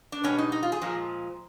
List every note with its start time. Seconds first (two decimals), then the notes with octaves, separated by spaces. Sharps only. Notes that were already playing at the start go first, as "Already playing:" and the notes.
0.12 D4
0.24 B2 G3 C#4
0.38 D#4
0.52 D#4
0.63 F4
0.72 G#4
0.81 A#2 F3 G#3